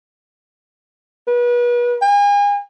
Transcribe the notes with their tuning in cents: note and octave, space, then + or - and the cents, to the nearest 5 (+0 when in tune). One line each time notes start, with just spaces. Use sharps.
B4 -35
G#5 -35